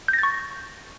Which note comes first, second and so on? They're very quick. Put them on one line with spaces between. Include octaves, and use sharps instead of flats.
G6 A#6 A6 C#6